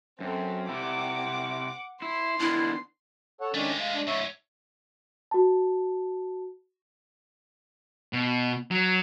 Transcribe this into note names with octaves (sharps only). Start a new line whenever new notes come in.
F#2 C4 A4
C3 E4 F#5 D6
E4 C6
D#3 B3 D4 E4
A4 C#5 F#5
D#3 G#3 A3 C#4 D4
F5
D4
G#2 C#3 C#5 E5
F#4 A5
B2
F#3